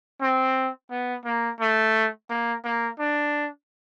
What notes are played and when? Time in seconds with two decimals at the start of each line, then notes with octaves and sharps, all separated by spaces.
0.21 C4
0.91 B3
1.25 A#3
1.60 A3
2.30 A#3
2.64 A#3
2.99 D4